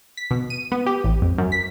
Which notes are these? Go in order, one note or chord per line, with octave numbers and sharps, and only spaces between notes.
B6
B2
D#7
B3
G4
A1
F2
F#2
B6